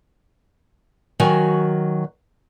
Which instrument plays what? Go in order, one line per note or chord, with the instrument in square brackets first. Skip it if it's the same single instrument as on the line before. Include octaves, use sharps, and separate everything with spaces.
[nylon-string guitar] D#3 F#3 F#4 G#5